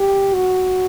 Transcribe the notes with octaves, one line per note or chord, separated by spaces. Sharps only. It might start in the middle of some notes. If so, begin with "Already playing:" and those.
Already playing: G4
F#4